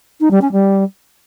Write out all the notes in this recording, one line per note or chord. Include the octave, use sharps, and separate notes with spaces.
D#4
G3
C#4
G3